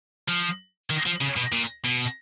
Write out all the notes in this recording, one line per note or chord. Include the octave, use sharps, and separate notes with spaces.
F3
D#3
F3
C#3
B2
A#2
B2